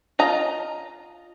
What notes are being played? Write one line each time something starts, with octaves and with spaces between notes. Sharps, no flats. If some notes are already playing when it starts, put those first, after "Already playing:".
F4 D#5 A#5